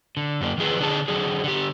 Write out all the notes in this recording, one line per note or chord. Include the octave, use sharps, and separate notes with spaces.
D3
F#2 A#3
D#3 F3 G#4 B4
D3 D4 G#4 A5
D3 F#3 G#4
D3 G4